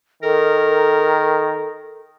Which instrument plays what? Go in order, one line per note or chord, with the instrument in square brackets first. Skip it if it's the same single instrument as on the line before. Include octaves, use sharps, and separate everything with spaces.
[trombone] D#3 [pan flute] A4 [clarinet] A#4